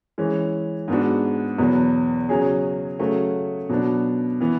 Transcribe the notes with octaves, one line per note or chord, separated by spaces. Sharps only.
E3 G#3 C#4
G#2 G#3 B3 D4 F#4
E2 B2 F#3 B3
C#3 F#3 C#4 G#4
C#3 F#3 A3 C#4 F#4
B2 F#3 B3 D4
E3 B3